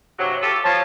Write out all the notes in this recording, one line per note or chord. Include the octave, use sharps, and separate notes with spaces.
G2 C3 F#3
F4 G4 A4
F3 C#5 A5